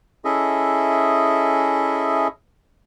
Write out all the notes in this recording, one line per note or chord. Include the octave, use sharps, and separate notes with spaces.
C#4 E4 G#4 A4 D#5 E5